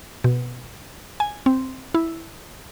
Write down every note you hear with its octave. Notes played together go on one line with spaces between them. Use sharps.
B2
G#5
C4
E4